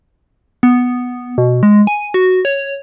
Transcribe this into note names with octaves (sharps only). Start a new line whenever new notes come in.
B3
B2
G#3
G#5
F#4
C#5